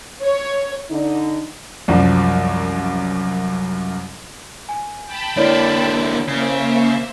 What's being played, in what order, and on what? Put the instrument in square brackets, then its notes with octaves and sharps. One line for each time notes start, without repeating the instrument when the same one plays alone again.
[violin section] C#5
[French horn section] D3 D#4
[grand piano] C2 F#2 F3
[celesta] G#5
[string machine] G5 A5 B5
[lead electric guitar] D3 A#3 [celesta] E4 C#5 D5
[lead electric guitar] C#3 [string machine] A#3 C5 E5